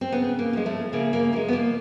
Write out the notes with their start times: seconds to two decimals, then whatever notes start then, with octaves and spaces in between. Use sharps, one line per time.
0.01 C4
0.12 C#3 B3
0.39 A#3
0.53 F3 G#3
0.66 A3
0.93 C#3 A#3
1.13 A#3
1.32 F3 A#3
1.36 G#3
1.48 B3
1.53 A#3